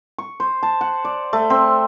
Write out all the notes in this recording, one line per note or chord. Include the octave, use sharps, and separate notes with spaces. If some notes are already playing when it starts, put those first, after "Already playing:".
C#6
C5
A5
F#5
D5
A3
C4